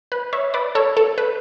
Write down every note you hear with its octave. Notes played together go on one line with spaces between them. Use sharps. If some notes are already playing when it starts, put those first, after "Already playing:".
B4
C#5 E5
B4 D5
A4 C#5
A4
B4